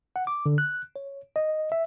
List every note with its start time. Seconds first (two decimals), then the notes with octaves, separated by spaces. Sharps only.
0.16 F#5
0.27 D6
0.46 D3
0.58 F#6
0.96 C#5
1.36 D#5
1.72 E5